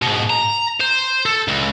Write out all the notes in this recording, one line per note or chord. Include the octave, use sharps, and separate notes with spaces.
G#2 B2
A#5
C5
A4
C#2